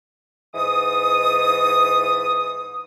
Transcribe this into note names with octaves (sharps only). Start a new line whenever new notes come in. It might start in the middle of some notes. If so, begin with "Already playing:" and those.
G#2 E3 D#6